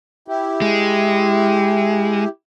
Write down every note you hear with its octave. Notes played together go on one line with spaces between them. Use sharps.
E4 G4
G#3